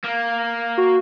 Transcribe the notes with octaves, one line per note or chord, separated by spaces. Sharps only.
A#3
F#4